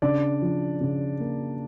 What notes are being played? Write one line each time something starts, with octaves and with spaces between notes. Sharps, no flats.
C#3 D4 D5
F3
C#3
A#3